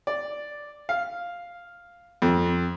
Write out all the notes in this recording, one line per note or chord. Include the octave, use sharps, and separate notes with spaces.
D5
F5
F2